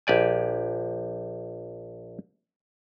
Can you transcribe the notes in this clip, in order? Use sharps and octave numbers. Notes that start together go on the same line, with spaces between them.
A#1 G4 D5 G#5